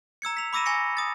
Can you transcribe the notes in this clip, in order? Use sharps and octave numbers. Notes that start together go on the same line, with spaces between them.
A#5 E6 G#6 C#7
B6 F7
B5 D6 E6 A#6 D#7 E7
G#5 C#6 A#6 C#7
D#6 A6